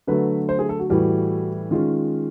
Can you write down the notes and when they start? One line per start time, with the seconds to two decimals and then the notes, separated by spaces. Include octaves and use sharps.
0.07 D3 F#3 A3 B4
0.49 C5
0.59 G#4
0.69 A4
0.80 F#4
0.90 A2 E3 G3 F#4
1.71 D#3 G#3 C#4 F4